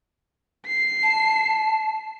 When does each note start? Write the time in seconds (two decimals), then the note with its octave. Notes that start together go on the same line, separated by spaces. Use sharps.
0.67 C7
1.03 A5